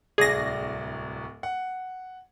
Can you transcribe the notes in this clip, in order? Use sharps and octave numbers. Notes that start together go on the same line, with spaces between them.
D1 C2 G#4 D5 A#6
F#5